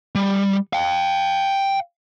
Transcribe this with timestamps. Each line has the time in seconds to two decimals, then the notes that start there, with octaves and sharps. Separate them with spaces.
0.15 G3
0.73 F5 G5